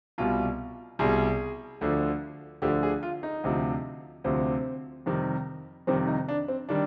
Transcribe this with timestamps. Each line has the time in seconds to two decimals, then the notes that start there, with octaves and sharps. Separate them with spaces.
0.18 C2 B2 G3 F4
0.99 C2 B2 G3 G#4
1.81 D2 D3 F3
2.62 D2 D3 F3 G4
2.83 G#4
3.03 F4
3.23 D#4
3.44 D2 C3 F3
4.24 D2 C3 F3 C4
5.06 F2 C3 D#3 G3
5.87 F2 C3 D#3 G3 C4
6.07 D#4
6.28 D4
6.48 C4
6.69 D#3 G3 D4